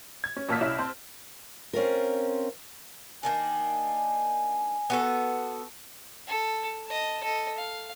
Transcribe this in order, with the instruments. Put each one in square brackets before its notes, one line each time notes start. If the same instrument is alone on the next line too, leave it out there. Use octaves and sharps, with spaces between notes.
[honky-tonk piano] G#6
C#4
A1 A#2 A5 E6 F6 B6
C2 C#4 E4 E7
C4 C5 A5
[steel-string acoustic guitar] C4 C#4 F4 A#4
[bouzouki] D#3 A#3 D4 [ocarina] G#5
[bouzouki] B3 F#4 A4
[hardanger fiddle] A4
D#5 A5
A4 D#5
F5